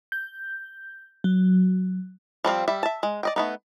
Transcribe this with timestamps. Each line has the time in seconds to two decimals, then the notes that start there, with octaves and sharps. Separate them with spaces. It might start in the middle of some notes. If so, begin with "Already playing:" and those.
0.12 G6
1.24 F#3
2.45 F3 G3 C4 F5
2.68 G3 E5
2.83 E5 A5
3.03 G#3
3.23 D5 D#5 G5
3.36 A3 B3 D#4